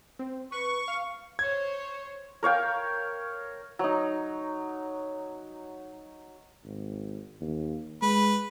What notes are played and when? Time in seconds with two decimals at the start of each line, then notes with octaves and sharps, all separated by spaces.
0.19 C4
0.52 B4 C#6
0.88 F5
1.39 C5 C#5 G#6
2.43 A#4 C#5 F5 G5
3.79 F#3 D#4
6.64 G#1
7.41 D#2
8.02 G#3 B4